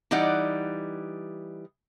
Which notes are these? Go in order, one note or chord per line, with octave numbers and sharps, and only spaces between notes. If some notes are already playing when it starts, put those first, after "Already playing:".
E3 G3 D#4 D5 F#5